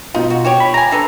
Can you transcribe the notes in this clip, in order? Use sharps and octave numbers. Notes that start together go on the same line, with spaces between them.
B2 D#4 F4
F#4
F#4 G4 C#5
B5
A3 G#5 A#5
D4 A4 B4